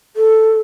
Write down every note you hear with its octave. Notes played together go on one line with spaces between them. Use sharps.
A4